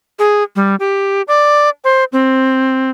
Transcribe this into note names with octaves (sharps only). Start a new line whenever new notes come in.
G#4
G3
G4
D5
C5
C4